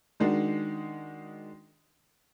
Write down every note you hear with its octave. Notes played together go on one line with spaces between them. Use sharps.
D#3 G#3 D4 D#4 F#4